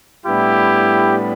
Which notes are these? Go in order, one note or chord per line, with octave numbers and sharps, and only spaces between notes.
A2 G3 B3 D4 E4 G4